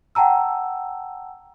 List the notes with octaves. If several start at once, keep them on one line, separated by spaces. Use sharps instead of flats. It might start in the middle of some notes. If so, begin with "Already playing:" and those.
F#5 G5 A5 A#5 E6